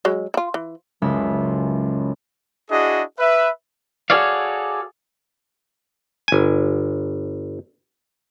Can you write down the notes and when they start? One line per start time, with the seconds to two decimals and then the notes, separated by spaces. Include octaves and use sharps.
0.05 F#3 G#3
0.34 E4 F4
0.54 E3
1.02 F#1 C#2 G#3 E5
2.70 D4 E4 F#4 G#4 D#5
3.19 B4 E5
4.10 F#4 G#4 A4 C#5 D5 F5
6.28 G1 G#5